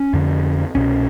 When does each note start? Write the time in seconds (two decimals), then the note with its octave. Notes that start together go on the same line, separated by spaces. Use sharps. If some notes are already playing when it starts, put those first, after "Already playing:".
Already playing: C#4
0.13 F2 D3
0.75 C2 B2 C#4